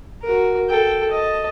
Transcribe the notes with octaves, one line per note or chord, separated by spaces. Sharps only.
F#4 A#4
A4 G5
D#5 A5